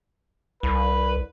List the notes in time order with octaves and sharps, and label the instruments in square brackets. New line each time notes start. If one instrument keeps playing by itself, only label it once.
[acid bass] C2 [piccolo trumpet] B4